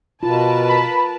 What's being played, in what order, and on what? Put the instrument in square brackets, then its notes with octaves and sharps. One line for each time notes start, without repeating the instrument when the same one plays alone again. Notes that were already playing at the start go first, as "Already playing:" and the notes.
[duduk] B2 [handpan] F4 [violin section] A#4 B4 A5
[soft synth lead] B5